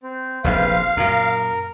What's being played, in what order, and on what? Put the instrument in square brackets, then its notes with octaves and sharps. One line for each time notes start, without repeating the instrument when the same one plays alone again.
[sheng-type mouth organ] C4
[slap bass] F1 A#1 F2 [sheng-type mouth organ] C4 B4 [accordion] F5
[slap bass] F#2 A#2 [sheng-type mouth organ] A#4 F6